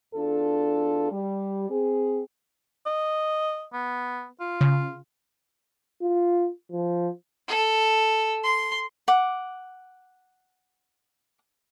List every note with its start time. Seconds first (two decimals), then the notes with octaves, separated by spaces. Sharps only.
0.15 E2 D4 F4 A4
1.11 G3
1.70 C4 G#4
2.86 D#5
3.73 B3
4.40 F4
4.61 C#3
6.02 F4
6.72 F3
7.48 A4
8.44 C6
9.08 F#5 D6